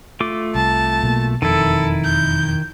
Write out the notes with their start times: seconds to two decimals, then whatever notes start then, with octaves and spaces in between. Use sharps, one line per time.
0.20 A3 F4 D6
0.55 C2 A5
1.02 B1 B2 A#3
1.42 E1 F2 D#3 E4 A4
2.04 G6